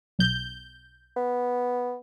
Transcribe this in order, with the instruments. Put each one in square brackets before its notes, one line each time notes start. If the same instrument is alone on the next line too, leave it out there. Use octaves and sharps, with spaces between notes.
[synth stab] B1 G6
[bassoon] B3